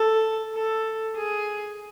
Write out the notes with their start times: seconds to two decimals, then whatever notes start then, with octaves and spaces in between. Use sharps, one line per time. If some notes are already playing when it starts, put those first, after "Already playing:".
Already playing: A4
0.54 A4
1.17 G#4